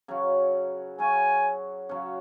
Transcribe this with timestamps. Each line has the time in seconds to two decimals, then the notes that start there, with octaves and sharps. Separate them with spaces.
0.08 C#3 F#3 C#4 F#4
0.98 C#3 F#3 C#4 F#4 G#5
1.89 C#3 F#3 C#4 F#4